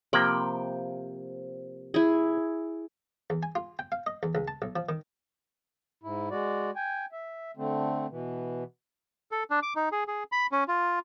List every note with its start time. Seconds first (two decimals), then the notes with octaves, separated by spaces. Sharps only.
0.13 C3 F3 A#3 G5 B5
1.94 E4 G#4
3.30 E2
3.43 G#5
3.55 F4
3.79 G5
3.92 F5
4.07 D#5
4.23 E2
4.35 C#2
4.48 A5
4.62 B1
4.76 F3
4.89 D#3
6.03 G#2 E4
6.31 G#3 F#4 D5
6.76 G5 G#5
7.12 E5
7.57 D3 A3 C4
8.10 B2 E3
9.31 A4
9.50 D4
9.63 D6
9.76 D#4
9.92 G#4
10.08 G#4
10.32 B5
10.52 C#4
10.68 F4